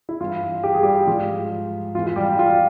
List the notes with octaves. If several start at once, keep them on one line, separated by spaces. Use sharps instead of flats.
E4
G2 E3 F4
G4
G#4
G3 G4
G#2 F3 F4
F2 E3 F4
F4
G3 G4
F4